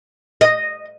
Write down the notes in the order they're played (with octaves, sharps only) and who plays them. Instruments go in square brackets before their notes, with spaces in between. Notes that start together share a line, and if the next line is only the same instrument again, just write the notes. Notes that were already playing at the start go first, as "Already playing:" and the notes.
[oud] D#5